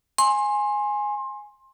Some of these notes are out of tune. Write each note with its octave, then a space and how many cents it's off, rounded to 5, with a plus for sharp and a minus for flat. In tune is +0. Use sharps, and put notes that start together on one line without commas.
G#5 +0 C6 +25